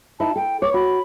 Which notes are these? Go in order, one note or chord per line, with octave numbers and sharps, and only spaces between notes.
D#4 E4 A5
A4 G5
C#5 D6
F#4 B5